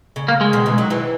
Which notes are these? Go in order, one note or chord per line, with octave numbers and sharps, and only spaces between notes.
C#3
A#3
G#3
B2 D#3
C#3 E3
D#3 F#3
E3 G#3